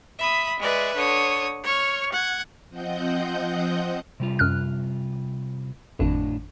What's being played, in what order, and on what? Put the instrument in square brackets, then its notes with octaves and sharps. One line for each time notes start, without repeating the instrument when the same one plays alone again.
[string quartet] E5 B5 D#6
G#3 B4 D5 E5
D3 C#5 D#6
C#5 C#6 F6
F#5 G#6
[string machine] F3 C4 D#5 F#5 G6
[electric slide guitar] C3 G3 F4
[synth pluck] F#2 F6 F#6
[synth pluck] G#1 F2 [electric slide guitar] A2 D4